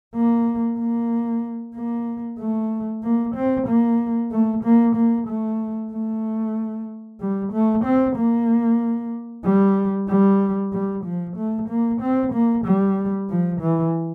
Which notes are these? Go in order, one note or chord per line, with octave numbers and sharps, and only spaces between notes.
A#3
A#3
A#3
A3
A#3
C4
A#3
A3
A#3
A#3
A3
A3
G3
A3
C4
A#3
G3
G3
G3
F3
A3
A#3
C4
A#3
G3
F3
E3